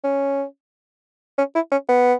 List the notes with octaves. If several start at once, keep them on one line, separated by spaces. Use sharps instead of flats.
C#4
C#4
E4
C#4
B3